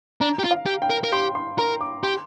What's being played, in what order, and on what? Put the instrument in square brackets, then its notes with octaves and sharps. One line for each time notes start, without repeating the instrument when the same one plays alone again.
[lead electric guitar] D4 [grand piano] A#5
[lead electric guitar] G4
F4
[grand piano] F5
[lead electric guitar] G4
[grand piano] G5
[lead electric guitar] A#4
A#4
[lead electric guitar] G4 [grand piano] C6
[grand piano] C6
[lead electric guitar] A#4 [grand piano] A#5
[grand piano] D6
[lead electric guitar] G4 [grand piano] C6